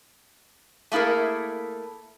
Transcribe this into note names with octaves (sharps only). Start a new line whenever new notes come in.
A3 A#3 E4 G#4 A#4